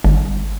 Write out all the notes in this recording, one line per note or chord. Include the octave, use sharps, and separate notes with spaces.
G1